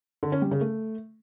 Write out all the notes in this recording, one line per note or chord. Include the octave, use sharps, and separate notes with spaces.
D3
C#4
G3
C#3
A3